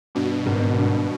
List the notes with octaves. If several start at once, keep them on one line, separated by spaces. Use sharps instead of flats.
G2 B2
G#1
G2